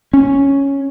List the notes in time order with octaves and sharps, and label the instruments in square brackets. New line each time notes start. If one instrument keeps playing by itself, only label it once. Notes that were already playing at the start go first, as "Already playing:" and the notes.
[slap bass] C#4